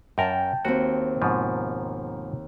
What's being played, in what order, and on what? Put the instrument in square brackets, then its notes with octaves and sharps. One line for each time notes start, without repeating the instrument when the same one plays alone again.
[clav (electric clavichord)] F#2 A#4 [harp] G5 A5
[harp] D#2 C4 [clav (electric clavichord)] F#4
[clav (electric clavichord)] G#2 B2 F3